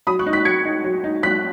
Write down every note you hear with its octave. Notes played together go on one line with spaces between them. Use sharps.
F#3 B5 D#6
C#6 F#6
D#4
F#6 B6
F#3 G#6 C#7
D#4
F#3
D#4
F#3 F#6 B6